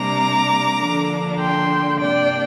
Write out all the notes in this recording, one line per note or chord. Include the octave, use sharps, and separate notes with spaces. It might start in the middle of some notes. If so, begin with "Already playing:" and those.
Already playing: C3 G3 A#3 D4 A#5 D6
D3 F3 A#3 D4
G5 C6
C3 A#3 D4 D5 G5